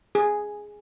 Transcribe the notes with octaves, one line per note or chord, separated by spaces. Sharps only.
G#4